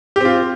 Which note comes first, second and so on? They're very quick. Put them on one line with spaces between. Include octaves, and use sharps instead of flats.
G4 C4 F4